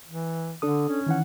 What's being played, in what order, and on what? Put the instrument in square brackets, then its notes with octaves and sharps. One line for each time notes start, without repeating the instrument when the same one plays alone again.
[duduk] E3
[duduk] D3 [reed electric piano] D4 A4 D#6
[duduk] C#4
[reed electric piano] D#3 E3 F#5